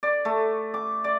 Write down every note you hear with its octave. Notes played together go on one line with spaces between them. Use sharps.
D5
A3
D6
D5